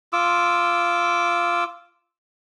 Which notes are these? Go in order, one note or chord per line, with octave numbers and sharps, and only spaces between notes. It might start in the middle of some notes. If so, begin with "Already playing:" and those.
F4 D6 E6